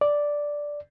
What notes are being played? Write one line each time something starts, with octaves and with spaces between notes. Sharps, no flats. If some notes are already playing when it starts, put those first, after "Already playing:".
D5